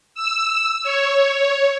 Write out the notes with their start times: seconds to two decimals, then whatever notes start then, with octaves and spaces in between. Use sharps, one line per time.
0.15 E6
0.83 C#5